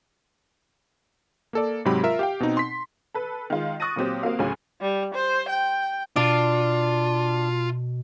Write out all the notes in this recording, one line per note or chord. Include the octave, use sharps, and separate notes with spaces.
A#3 A4 D5
G#2 C3 F#3 G#3 G4 B5
F4 A#4 E5
G4 F5 G5
B2 C4 D#4
C6 B6
A4 B4
D#3 G#3 F4
C#6 D#6 F#6 A6 A#6 D#7
A#2 F#3 C4 G4
A#3 C4 F#4 A#4 F5
D2 A2 C#3 F#3 G#5
G3
C5
G5
B2 D4 F4